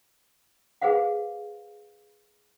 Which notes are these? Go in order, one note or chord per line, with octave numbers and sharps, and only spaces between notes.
G#4 B4 C5 F5 F#5